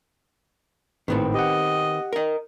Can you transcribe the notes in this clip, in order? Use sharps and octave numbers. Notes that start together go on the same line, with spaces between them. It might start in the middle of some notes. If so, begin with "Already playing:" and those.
G#1 A2 D#3 B3 C4
G4 D#5 F#5
A#4 D#5